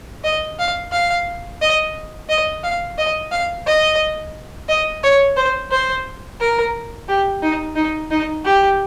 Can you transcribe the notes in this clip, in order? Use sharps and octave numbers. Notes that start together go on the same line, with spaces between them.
D#5
F5
F5
D#5
D#5
F5
D#5
F5
D#5
D#5
C#5
C5
C5
A#4
G4
D#4
D#4
D#4
G4